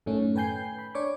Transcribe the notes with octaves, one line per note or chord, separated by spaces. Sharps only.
F#2 A2 D#3 A3 C#4
B4 G5 G#5 G6 C7
B5
D4 C#5 C#6 D6